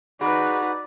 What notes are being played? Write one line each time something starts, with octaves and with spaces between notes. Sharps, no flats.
D#4 F#4 G#4 B4 D5 B5